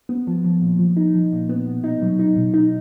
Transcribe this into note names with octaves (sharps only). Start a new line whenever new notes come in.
B3
F3
F3
A#2
F3
D#4
F3
A#2
B3
B2
D#4
F#3
D#4
B2
D#4